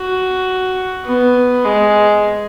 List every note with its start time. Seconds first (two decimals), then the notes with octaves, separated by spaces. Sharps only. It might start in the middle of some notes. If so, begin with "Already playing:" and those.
Already playing: F#4
1.06 B3
1.64 G#3